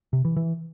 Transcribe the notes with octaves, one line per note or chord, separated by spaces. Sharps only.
C3
E3
E3